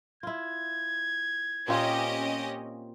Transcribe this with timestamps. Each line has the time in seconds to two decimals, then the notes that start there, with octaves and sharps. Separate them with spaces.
0.23 E4 F4 G#6
1.68 A#2 C4 C#4 F4 G4 D#5